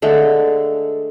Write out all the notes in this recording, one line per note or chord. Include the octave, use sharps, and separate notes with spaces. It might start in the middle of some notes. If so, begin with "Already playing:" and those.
D3 G#3 A3